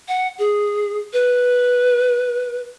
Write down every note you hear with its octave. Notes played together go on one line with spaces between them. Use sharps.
F#5
G#4
B4